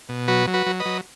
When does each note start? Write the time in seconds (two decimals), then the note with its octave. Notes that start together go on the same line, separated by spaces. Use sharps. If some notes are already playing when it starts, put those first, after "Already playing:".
0.09 B2
0.28 F#3 F#4 B4
0.47 F#3
0.54 F#4 B4
0.66 F#3
0.80 B4 D#5
0.86 F#3